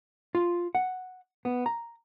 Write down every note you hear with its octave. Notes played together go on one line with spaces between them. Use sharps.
F4
F#5
B3
A#5